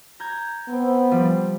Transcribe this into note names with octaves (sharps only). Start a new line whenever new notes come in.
A#5 G6 G#6
B3 C4 G5
F3 G3